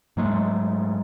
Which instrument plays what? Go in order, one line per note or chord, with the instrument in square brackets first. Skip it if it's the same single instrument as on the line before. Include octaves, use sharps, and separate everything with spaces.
[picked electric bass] G#2 F#3 G#3 A3